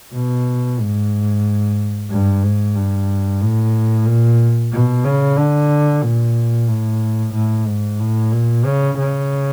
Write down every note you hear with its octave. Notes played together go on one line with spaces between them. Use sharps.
B2
G#2
G2
G#2
G2
A2
A#2
B2
C#3
D3
A#2
A2
A2
G#2
A2
A#2
C#3
C#3